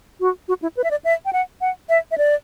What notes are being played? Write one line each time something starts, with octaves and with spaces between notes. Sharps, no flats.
F#4
F#4
E4
B4
E5
D5
E5
G5
F#5
F#5
E5
E5
D5